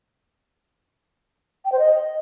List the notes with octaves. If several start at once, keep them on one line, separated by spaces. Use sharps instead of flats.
G5
C5
D#5